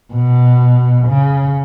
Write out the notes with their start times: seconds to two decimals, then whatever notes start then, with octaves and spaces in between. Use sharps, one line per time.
0.14 B2
1.08 C#3